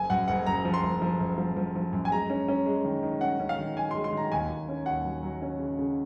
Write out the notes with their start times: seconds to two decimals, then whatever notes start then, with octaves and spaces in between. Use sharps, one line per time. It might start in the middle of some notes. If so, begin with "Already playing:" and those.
Already playing: F#1 G#5
0.10 F#2 F#5
0.28 F#1 F#5
0.47 F#1 A#5
0.65 F3
0.74 C6
0.83 F#1
1.02 F3
1.20 F#1
1.38 F3
1.56 F3
1.75 F3
1.93 F#2
2.05 G#5
2.12 G#3 A#5
2.30 C#4
2.48 C#4
2.66 G#3
2.85 D#3
3.03 D#3
3.21 C#4 F#5
3.40 C#4
3.49 F5
3.59 D#3
3.76 D#3 G#5
3.91 G#3 C6
4.04 C6
4.13 D#3 A#5
4.32 D#2 G#5
4.50 D#2
4.69 C#4
4.86 D#2 F#5
5.04 F#3
5.23 F#3
5.42 C#4
5.59 C#3
5.79 C#3